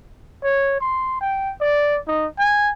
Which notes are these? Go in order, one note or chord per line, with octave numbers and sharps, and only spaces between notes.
C#5
C6
G5
D5
D#4
G#5